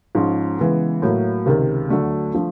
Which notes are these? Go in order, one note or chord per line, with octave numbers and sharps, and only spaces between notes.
G#2 F3 G#3 C#4
C#3 E3 G#3 B3
A2 F#3 A#3
C#2 C3 D#3
D2 D3 F#3 A3 D4
D3 F3 A3